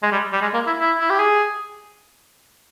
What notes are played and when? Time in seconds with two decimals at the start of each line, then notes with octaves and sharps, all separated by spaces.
0.03 G#3
0.12 G3
0.33 G3
0.42 G#3
0.54 A#3
0.67 E4
0.80 E4
1.00 E4
1.10 G4
1.19 G#4